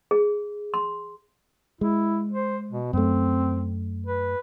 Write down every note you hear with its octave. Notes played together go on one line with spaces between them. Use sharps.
G#4
C6
G#3 E4
C5
B2
F#2 A3 C4
B4